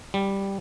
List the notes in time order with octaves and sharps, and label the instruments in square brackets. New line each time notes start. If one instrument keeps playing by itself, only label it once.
[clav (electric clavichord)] G3